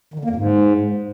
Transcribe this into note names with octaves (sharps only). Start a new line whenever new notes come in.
D#3
D3
A#3
F2
G#2